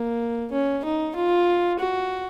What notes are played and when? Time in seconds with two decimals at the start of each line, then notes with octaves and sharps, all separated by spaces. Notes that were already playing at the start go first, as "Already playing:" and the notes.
Already playing: A#3
0.52 C#4
0.85 D#4
1.15 F4
1.79 F#4